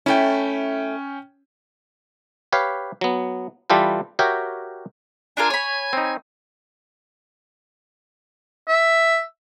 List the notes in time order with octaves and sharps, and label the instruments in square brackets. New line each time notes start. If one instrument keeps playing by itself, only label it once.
[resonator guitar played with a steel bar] A3 E4 [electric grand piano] C#4 G5
[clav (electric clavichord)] G4 B4 C#5 F5
F#3 B3
E3 G3 F4 G4 A4 B4
F#4 G4 A#4 C#5 E5 G5
[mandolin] D4 F4 A#4 [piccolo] G#5
[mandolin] C#5 B5
[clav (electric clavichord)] C4 D#4
[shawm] E5